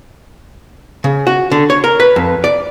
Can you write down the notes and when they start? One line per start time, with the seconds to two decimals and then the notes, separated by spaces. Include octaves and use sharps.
1.04 C#3
1.27 F#4
1.51 D3
1.70 C#5
1.84 A#4
2.00 B4
2.16 F2
2.44 D5